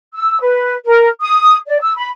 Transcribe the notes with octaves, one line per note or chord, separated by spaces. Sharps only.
E6
B4
A#4
D#6
D5
E6
B5